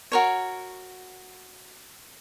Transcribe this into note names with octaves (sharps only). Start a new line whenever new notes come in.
F#4 A#4 C#5